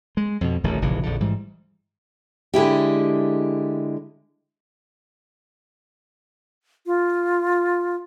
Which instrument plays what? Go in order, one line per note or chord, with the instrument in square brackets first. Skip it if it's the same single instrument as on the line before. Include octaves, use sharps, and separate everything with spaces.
[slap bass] G#3
F2 B2
D1 A1 D#3
F1 A#1 C#3 E3
A#1 F2 D3
G#2 E3 G3
[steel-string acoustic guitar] D3 G#3 E4 G4
[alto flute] F4